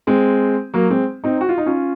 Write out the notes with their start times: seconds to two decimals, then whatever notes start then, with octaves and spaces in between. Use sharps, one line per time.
0.07 G#3 C4
0.74 F#3 A#3
0.90 G#3 C4
1.24 C4 D#4
1.41 F#4
1.49 F4
1.58 D#4
1.66 C#4 F4